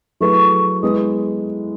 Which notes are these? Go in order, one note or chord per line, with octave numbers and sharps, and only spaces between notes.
F#3 A3 E4 G#4 B4 C#6
G#3 B3 E4 B4 D#6